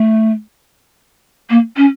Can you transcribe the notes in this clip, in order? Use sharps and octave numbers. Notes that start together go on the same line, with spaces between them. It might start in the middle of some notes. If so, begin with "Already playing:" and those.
Already playing: A3
A#3
C#4